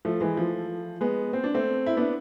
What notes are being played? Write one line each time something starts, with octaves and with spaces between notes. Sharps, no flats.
F3 A3
E3 G#3
F3 A3
G#3 B3
C4
D4
A3 C4
E4
B3 D4